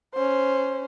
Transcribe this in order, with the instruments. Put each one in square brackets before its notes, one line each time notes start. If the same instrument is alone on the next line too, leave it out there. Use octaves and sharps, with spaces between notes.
[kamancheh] C#4 C5